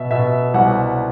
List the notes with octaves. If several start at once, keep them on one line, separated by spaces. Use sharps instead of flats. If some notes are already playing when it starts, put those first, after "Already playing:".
Already playing: B2 E5
B2 E5
C2 F#5